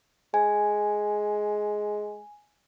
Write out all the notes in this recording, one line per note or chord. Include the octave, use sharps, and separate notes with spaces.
G#3 G#5